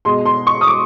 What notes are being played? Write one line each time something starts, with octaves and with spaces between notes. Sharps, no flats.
B2 G#3 C6
C6
C#6
D#6
D6